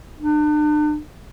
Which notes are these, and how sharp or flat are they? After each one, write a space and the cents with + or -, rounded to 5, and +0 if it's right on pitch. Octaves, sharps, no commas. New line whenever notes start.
D4 +40